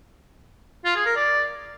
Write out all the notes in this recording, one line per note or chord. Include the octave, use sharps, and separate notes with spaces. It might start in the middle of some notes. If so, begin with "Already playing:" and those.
F4
G#4
A#4
D5